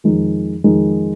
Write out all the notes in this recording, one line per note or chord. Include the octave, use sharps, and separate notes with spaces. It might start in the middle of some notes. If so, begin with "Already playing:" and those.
F2 D#3 G#3 D#4
F2 D#3 G#3 D#4